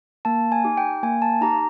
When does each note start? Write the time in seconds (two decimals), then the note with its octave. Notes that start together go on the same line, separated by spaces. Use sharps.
0.25 A#3 A5
0.52 G#5
0.64 D#4 G4
0.77 G5
1.03 A#3 G#5
1.22 A5
1.41 D#4 G4 A#5